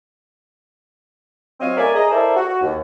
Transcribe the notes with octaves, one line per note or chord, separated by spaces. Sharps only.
F#3 C4 C5 C#5 D#5 F5
A3 A#4 C#5 D5 E5 G#5
G#4 D#5 A#5
E4 A4 A#4 C5 D5 E5
F#4
D#2